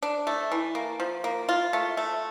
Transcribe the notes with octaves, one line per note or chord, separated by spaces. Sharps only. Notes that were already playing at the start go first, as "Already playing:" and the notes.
D4
A3
E3
A#3
F3
A#3
F4
A3
A3